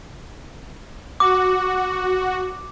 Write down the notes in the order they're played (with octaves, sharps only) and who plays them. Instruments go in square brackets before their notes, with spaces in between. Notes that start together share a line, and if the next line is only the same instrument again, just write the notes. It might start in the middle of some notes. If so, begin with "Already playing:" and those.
[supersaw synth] F#4 [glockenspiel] D6